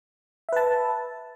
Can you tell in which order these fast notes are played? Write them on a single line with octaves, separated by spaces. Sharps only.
E5 B4 A5